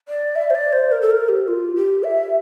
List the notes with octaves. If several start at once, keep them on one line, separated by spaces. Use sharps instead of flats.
D5
E5
C5
D5
C5
A#4
A4
A#4
G4
F4
G4
E5